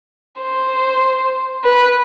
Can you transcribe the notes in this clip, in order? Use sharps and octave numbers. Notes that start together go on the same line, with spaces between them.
C5
B4